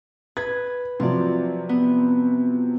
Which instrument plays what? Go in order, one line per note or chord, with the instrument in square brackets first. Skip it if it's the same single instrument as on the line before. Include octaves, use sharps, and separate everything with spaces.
[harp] B4 [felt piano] G#6
[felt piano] C3 F3 F#3 [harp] F4 D5
[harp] B3